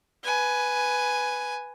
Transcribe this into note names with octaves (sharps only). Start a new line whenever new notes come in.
B4 G#5